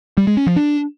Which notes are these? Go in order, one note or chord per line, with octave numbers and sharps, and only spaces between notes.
G3
G#3
C#4
F3
D4